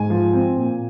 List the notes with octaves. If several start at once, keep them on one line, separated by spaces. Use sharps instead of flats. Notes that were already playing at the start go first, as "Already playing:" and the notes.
Already playing: G#2 G#5
F3
C4
A#2